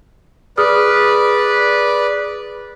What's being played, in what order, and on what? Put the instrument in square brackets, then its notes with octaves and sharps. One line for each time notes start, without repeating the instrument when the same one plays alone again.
[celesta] G#4 D#6 F6 [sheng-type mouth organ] B4 D5